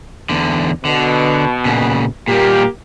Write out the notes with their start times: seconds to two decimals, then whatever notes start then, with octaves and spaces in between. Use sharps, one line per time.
0.29 E2 D3
0.85 B2 D3
1.65 A#2 C#3
2.28 A#2 G3 A#3 G4